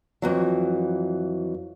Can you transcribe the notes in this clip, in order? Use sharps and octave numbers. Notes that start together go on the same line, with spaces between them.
F2 E3 F#3